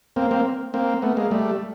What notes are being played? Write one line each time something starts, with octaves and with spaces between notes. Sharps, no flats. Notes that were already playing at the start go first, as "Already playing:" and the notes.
A#3 C4
A#3 C4
A#3 C4
A3 B3
G#3 A#3
G3 A3